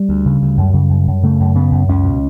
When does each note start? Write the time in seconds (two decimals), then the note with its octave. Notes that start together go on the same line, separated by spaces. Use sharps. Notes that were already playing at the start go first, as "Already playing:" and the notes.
Already playing: G3
0.09 D2
0.25 C#3
0.42 D2
0.57 F#2
0.73 C#3
0.90 F#2
1.07 F#2
1.23 C#3 A3
1.40 F#2
1.55 C#3 B3
1.72 F#2
1.89 C#2 C#4
2.05 B2